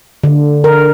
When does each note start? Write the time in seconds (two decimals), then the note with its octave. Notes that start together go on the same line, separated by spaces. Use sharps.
0.24 D3
0.64 A#4